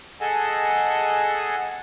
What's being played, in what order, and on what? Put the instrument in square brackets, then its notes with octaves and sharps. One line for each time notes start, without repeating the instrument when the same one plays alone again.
[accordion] G#4 A4 D#5 F#5 G#5 A5